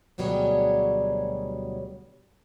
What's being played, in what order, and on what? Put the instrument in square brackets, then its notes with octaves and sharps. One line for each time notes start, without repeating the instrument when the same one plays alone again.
[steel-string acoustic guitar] D2 B2 F#3 G3 G#4 C#5